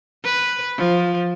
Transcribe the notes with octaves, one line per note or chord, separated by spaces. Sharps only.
B4
F3